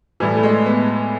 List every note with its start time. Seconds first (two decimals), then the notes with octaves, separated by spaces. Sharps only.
0.20 A2 E3 G3
0.35 A3
0.43 G#3
0.66 B3